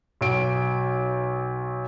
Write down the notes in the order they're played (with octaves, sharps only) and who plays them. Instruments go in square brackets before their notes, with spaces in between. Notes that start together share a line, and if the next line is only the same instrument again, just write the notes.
[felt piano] B1 D7